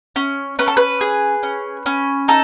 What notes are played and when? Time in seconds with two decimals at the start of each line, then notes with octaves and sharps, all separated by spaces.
0.16 C#4
0.59 C#4 B4
0.68 A4
0.77 B4
1.01 G#4
1.43 C#4
1.86 C#4
2.28 D#4 A4